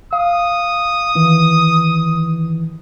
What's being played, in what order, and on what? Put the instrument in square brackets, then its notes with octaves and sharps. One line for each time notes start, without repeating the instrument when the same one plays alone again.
[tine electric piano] F5 [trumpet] D#6
[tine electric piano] D#3 E3